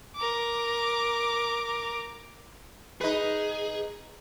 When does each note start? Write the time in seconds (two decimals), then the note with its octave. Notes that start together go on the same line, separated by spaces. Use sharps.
0.16 A#4 D6
3.01 D#4 G#4 B4